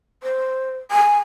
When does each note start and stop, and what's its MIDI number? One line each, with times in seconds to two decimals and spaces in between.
0.23 0.78 72
0.91 1.17 80